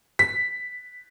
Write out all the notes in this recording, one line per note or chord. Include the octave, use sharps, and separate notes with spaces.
B6